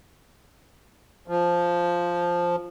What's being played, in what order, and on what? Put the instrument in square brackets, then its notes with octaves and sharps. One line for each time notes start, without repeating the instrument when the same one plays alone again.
[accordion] F3